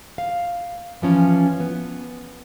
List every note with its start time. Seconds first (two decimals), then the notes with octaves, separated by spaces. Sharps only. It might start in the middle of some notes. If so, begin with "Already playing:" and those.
0.18 F5
1.02 E3 F3 C#4
1.60 B3